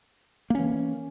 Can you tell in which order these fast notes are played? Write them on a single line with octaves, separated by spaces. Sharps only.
A#3 C#4 E3